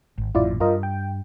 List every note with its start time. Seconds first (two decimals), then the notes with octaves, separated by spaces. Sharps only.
0.18 G#1
0.35 A1 F#2 A#2 E4 F4 D5
0.60 G2 G3 F4 A#4 D#5
0.83 G5